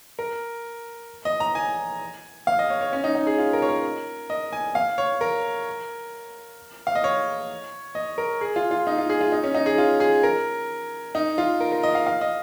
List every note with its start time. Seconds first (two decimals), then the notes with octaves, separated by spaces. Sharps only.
0.19 A#4
1.25 D#5
1.40 A#5
1.55 G#5
2.47 F5
2.59 D#5
2.70 C#5
2.81 C#5
2.93 C#4
3.04 D#4
3.15 D#4
3.27 G#4
3.38 F4
3.53 A#4
3.62 C#5
3.69 A#4
4.30 D#5
4.52 G#5
4.75 F5
4.98 C#5
5.21 A#4
6.87 F5
6.95 D#5
7.04 C#5
7.95 D#5
8.18 A#4
8.41 G#4
8.56 F4
8.71 F4
8.87 D#4
8.98 F4
9.10 G#4
9.21 F4
9.32 D#4
9.43 C#4
9.55 D#4
9.66 G#4
9.78 F4
10.00 G#4
10.23 A#4
11.15 D#4
11.38 F4
11.60 A#4
11.72 A#4
11.83 D#5
11.95 F5
12.06 F5
12.21 D#5